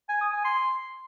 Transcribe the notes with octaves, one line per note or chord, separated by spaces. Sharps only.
G#5
D#6
G#5
C6